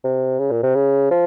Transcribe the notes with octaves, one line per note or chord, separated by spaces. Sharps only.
C3
C#3
A#2
C3
C#3
F3